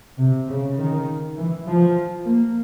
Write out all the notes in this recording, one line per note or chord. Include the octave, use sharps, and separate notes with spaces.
C3
C#3
D#3
E3
F3
A#3